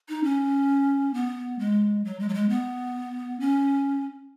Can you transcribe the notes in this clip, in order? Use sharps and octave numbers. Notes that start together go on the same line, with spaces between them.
D#4
C#4
B3
G#3
F#3
G#3
F#3
G#3
B3
C#4